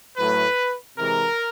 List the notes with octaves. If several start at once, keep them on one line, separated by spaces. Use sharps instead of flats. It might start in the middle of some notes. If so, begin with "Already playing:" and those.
A2 F#3 A3 B4
C3 E3 G#3 A#4